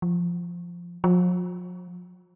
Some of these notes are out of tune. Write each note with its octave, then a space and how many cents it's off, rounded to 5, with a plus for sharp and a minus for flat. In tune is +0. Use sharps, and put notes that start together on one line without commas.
F3 -5
F3 +45